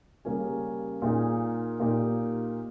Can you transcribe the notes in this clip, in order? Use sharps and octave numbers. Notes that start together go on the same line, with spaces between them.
C#3 G3 A#3 C#4 G#4
A#2 A#3 D#4 G#4
A#2 A#3 D#4 G4